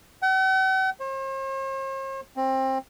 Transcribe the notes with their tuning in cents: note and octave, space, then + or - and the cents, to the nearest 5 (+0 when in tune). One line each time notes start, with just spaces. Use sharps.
F#5 +45
C5 +45
C4 +20